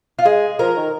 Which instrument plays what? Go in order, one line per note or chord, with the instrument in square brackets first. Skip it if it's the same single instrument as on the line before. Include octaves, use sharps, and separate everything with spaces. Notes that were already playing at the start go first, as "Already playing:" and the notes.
[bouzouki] F4
[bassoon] G#3 [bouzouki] G#4
[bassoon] F3 [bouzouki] A#4
[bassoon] D#3